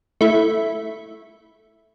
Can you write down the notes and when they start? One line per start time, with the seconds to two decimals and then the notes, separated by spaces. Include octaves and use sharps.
0.21 A3 E4